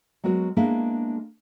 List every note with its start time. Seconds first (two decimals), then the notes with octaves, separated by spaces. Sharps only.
0.24 F#3 G#3 B3 F#4 A#4
0.57 G#3 A#3 B3 D4 E4 G#4